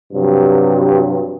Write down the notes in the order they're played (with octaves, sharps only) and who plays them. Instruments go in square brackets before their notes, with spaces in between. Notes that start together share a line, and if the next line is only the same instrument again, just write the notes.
[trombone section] G2 C3 F3 F#3